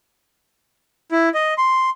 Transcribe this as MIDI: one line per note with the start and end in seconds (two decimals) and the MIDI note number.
1.12 1.29 64
1.34 1.54 75
1.58 1.90 84